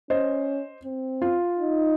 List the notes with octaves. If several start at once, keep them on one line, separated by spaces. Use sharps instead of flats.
C#4 C5 D#5
C4
F4
D#4